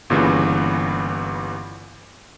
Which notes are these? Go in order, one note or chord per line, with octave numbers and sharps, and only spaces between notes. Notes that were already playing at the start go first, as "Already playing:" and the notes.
G1 A#2 C#3 E3 G3